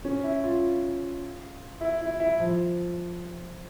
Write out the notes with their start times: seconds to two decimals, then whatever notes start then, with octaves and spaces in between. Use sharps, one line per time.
0.05 C#4
0.24 E4
0.44 F4
1.81 E4
2.01 E4
2.20 E4
2.40 F3